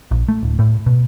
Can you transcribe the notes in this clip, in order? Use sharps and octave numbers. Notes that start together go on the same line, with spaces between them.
A#1
A3
D1
A2
B2